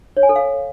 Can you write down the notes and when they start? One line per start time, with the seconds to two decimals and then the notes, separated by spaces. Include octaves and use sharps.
0.17 C#5
0.23 G#5
0.29 A4
0.36 F5